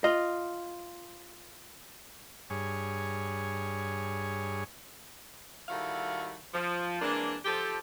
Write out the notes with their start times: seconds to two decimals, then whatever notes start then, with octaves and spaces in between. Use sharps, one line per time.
0.04 F4 D#5
2.50 G2 G#4 C#5
5.69 D#3 G3 E4 F#4 A4 F5
6.54 F3
7.02 E3 G#3 A#3 C4 D4
7.45 F3 G4 A4